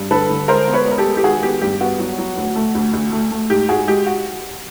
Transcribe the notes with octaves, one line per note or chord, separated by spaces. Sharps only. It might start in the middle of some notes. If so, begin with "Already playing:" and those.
Already playing: G2
D3 A4 B4
D3
G#3 A#4 C5
B3
B4 C#5
G#3
A#4
G4 A4
G#3
G4
D#3 F#4 G#4
B3 G4
G2 G4
B3 F#4
F#3
F#3
D2
A3
D2
D2
A3
A3
G#2 G4
G#2 F#4 G#4
G#3 G4
F#4